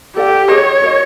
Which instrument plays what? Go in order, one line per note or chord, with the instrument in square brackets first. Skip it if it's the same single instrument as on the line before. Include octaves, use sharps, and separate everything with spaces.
[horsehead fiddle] G4 [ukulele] A4 D5 F#5
[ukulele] G#4 B4 D#5 [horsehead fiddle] C#5
[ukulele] F#4 A#4 D#5